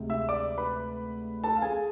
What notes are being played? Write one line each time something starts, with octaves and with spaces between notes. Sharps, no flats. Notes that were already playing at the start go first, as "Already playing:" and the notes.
Already playing: D2 C3 G#3
E5 E6
D5 D6
B4 B5
A4 A5
F5
G#4 G#5